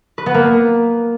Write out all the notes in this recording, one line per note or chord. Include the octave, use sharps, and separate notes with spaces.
B4
B3
A#3